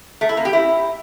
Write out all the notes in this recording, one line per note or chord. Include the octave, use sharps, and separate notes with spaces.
A3
E4
A#3
G4
E4